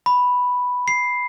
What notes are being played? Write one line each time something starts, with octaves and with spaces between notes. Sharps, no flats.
B5
C7